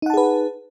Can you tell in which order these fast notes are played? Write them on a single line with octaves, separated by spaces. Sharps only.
D#4 F#5 A5 G#4 B4